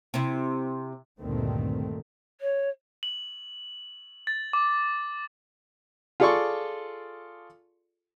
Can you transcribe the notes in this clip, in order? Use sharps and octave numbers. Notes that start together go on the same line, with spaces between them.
C3 E4
D2 G2 A#2 D#3 A3 C4
C#5
F#7
A6
D6
F4 G#4 A4 D5 C6 C#6